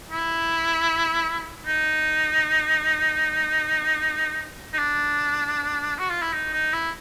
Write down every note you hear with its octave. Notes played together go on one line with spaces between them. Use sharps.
E4
D#4
D#4
D4
F#4
F4
E4
D#4
D#4
E4